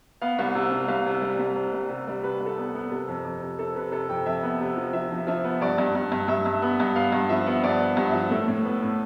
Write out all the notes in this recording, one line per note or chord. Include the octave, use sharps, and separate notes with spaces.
B3 F5
C2
C3
C2
C2 F5
C3
G3
C2
C3
G3
C3
G3
C3 B4
C2
A4
B3
B3
C3 A4
F2
F2
C3
C3 A4
C3 B4
C3 A4
F2 G5
F2 E5
B3
C3
F3
F3 E5
F3
F3 E5
B3
G2 D5
G2
G2
G2
G2 E5
G2
B3
G2
B3 F5
G2
F3 E5
B3
G2 D5
B3
G2
E5
F3
A2 A4
A2
B3 B4
A2